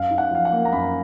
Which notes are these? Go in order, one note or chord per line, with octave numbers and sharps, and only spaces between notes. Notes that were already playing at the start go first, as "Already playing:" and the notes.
Already playing: F#2 F5
D#4
F#5
F3 F5
F#5
A#3
A#5
F#2 B5